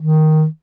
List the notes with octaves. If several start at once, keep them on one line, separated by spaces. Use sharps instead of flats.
D#3